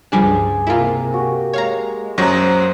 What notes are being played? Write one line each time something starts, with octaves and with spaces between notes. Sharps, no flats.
C#2 G2 F3 G3 D4 G#4
C3 A#3 E4 F4 A#4 D#5
F#4 G4
G#3 C#5 F5 A#5
F#2 F#3 C5 D#5 A#5 C#6 A#6